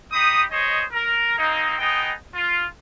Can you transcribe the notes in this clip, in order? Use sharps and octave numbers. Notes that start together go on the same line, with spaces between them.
D#4 G4 B5 D#6
G#4 C5 C#5 D#5
A#4
A#3 C4 D#4
B3 D#4 G#4 D#5 G5
F4